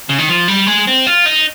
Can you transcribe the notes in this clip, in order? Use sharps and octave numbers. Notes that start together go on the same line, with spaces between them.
C#3
D#3
F3
G3
G#3
C4
F4
D#4